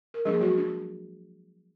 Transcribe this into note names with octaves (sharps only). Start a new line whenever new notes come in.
A#4
F3 G#3 A#3 D4 G#4
F#3 F#4
F#3 D4